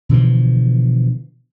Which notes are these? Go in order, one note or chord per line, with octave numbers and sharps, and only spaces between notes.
B2 D3 E3 F3